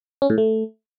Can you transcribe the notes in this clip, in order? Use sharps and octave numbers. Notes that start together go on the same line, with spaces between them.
C#4
A2
A3